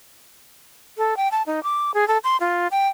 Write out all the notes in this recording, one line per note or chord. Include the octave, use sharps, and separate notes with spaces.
A4
G5
A5
D#4
D6
G#4
A4
C6
F4
G5